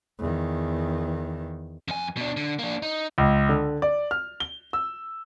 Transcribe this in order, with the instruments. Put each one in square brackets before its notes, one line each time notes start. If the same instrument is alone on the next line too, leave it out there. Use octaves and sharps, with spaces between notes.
[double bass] E2 D#3
[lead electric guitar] F2 G#5
B2 D4
D3
A#3 D4
D#4
[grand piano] C#2
D3
D5
F6
G7
E6